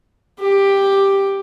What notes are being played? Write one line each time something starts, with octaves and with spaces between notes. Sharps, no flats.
G4